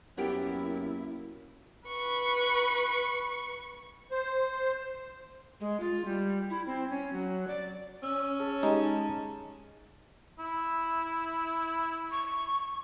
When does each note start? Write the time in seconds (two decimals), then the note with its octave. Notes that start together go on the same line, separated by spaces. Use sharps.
0.17 F#2 A#3 B3 E4 G4
1.87 B4 C#6
4.11 C5
5.60 G#3
5.80 F4
6.05 G3
6.50 E4
6.67 C4
6.89 C#4
7.13 F#3
7.48 D5
8.03 C#4 E6
8.39 G#4 C#5 A5
8.63 G#3 D#4 G4
10.39 E4
12.11 C#6